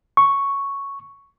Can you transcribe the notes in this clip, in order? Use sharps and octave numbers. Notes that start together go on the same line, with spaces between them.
C#6